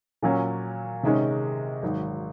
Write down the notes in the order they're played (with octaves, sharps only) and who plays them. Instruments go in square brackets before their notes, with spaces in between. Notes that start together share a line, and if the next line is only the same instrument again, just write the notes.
[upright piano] A#2 F#3 C#4
C3 D#3 G#3 C#4
G#1 G#2 F#3